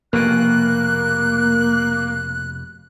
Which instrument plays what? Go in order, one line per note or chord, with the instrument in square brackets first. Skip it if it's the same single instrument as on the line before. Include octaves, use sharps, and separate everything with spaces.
[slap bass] F1 B2 [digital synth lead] A#3 [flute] F#6